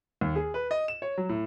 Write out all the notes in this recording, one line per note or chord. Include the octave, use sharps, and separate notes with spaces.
D#2
G#4
B4
D#5
E7
C#5
F#3
A2